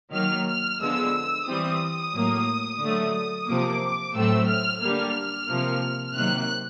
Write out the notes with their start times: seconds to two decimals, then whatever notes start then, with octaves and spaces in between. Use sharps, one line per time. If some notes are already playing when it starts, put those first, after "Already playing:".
0.13 D#3 F#3 A#3 F6
0.47 F6
0.80 D3 F3 G#3 B3 E6
1.47 E3 G3 C4 D#6
2.13 A2 F#3 A#3
2.81 D3 F#3 A3
3.48 C3 F3 A#3 D6
4.14 A2 F#3 A3 C4 E6
4.48 F6
4.81 D3 G3 A#3 F6
5.49 C3 F3 A#3
6.15 C3 D#3 F#3 A#3 F#6